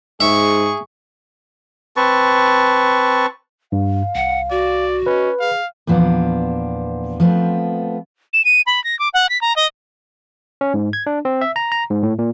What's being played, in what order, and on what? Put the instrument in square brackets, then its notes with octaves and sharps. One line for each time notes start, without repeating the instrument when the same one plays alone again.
[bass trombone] G#2 [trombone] G#4 [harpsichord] E5 [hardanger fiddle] C#6
[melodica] C4 B4 A5 C#6
[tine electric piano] G2 [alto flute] F5
[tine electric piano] C2 [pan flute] F#5
[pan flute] F#4 [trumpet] D5
[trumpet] C#4 [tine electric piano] B4 [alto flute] D#5
[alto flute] G#4 [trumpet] F5
[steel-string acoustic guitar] E2 A#2 F3 B3 D4
F3 A3 B3 C4
[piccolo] E7
D#7
B5
A#6
D6
F#5
B6
A#5
D#5
[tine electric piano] C#4
G#2
G#6
D4
C4
E5
A#5
A#5
G#2
A2
A#2